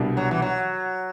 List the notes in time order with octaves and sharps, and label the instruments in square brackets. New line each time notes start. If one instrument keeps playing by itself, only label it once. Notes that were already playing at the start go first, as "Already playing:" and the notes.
Already playing: [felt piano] C2 B2 G3 D4
[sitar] F#3
E3
F#3